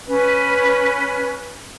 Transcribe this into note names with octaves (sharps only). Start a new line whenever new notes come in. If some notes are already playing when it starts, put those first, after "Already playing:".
C#4 B4